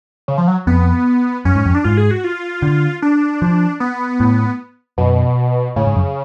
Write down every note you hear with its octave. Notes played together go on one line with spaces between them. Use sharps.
C#3
F3
F#3
F2 B3
F#2 C#4
G#2
F2
D4
G#2 F4
G#4
F#4
F4
D3
D4
F3
B3
A2
F#2 B2
A2 C#3
G#2
F#2